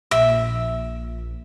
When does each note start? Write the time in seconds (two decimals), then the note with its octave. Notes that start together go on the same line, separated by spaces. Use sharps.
0.11 A#1 E5